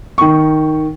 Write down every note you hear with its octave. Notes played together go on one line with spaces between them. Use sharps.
D#3 C#6